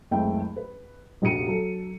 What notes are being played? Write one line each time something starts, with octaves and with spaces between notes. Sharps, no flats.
F#1 C#2 A3 C4 G5
B4
F1 A#1 F#4 G4 C#7 D#7
F#3 A4